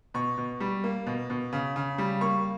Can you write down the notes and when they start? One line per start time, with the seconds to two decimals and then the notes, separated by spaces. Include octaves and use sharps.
0.14 B2 C#6
0.38 B2
0.60 G3
0.84 A#3
1.06 B2
1.30 B2
1.53 C#3
1.76 C#3
1.98 G3
2.21 A#3 C#6